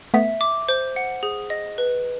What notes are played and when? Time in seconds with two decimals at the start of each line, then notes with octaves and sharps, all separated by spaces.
0.14 A3 B3 E5
0.41 D6
0.69 C5
0.96 F#5
1.23 G#4
1.50 D#5
1.78 B4